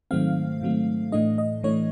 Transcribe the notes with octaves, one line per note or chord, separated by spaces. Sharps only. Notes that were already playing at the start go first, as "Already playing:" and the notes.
G#2 D#3 F#3 A3 C4 F5
G#2 D#3 F#3 A3 C4
A2 E3 A3 D4 D#5
D#5
A2 E3 A3 D4 C#5